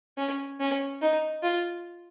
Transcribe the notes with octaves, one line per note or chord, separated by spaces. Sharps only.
C#4
C#4
D#4
F4